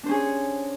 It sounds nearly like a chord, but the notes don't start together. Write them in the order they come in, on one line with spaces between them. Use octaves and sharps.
D4 C5 C#4 G#4 C#5